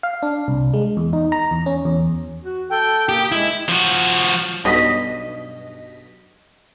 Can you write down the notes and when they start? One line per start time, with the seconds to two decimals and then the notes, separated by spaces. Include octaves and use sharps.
0.03 F5
0.23 D4
0.48 C2
0.74 G#3
0.97 E2
1.13 D#4
1.32 A#5
1.51 E2
1.66 C#4
1.85 E2
2.44 F#4
2.70 A4 G5
3.09 A#3 G4 D#6
3.32 G#3 E4
3.69 F3 F#4
4.64 B1 G2 B2 D#5 B6